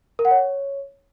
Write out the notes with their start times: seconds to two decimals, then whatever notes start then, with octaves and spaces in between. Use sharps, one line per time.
0.19 A#4
0.25 F#5
0.31 C#5